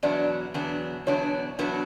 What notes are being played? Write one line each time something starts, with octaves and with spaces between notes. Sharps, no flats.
E2 B2 F#3 B3 D4 D5
E2 B2 F#3 B3 D4
E2 B2 F#3 B3 D4 C#5
E2 B2 F#3 B3 D4